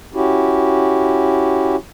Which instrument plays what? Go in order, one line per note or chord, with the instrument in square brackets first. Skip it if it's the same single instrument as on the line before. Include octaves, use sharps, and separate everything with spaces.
[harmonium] C#4 E4 F#4 G4